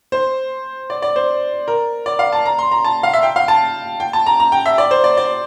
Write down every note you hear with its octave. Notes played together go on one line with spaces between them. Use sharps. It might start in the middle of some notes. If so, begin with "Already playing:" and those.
C5
D5
D5
C5
A#4
D5
F5
A5
A#5
C6
A#5
A5
F5
E5
G5
F5
A5
G5
A5
A#5
A#5
G5
E5
D5
C5
D5
D5